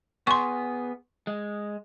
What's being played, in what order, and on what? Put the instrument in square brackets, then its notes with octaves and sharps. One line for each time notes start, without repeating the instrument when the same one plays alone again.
[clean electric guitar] B3 G#4 [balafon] C6 C#6
[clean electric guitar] G#3